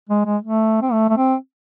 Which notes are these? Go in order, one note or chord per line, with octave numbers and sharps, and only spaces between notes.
G#3
G#3
A3
C4
A3
A3
C4